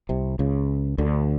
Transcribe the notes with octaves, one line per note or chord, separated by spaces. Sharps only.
C2 C3
C#2 C#3
D2 D3